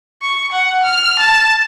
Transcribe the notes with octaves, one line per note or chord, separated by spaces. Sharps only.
C#6
F#5
F6
A5